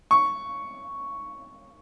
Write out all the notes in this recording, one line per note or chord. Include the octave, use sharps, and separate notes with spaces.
C#6